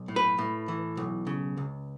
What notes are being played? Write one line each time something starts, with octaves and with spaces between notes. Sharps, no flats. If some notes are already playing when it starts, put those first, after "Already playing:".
Already playing: B1
A2
B4
A2
E3
B1
C#3
C#2